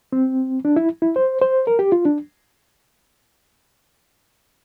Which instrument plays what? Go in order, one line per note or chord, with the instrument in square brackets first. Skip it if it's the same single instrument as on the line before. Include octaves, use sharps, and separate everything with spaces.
[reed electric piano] C4
D4
E4
E4
C5
C5
A#4
G4
F4
D4